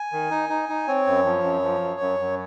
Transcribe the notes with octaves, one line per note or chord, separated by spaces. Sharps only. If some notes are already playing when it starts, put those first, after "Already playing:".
Already playing: G#5
D#3
D#4
D#4
D#4
C4 C#5
F#2
F3
F#2
F3
F#2
F#2
F#2